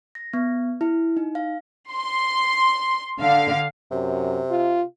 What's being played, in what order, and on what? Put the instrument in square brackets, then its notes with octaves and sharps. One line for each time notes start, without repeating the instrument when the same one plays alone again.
[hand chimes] A#6
B3
E4
D#4
F5
[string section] C6
D3 F5
[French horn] F#2 [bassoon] C3
[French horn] F4